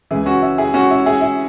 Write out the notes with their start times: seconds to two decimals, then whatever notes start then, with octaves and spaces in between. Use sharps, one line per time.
0.11 C#2 C#3 E3 E4 G#4
0.26 C#4 F#4
0.42 E4
0.58 E4 G#4
0.74 C#4 F#4
0.90 E4
1.06 E4 G#4
1.22 E4